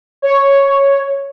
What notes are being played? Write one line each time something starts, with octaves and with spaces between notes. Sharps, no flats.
C#5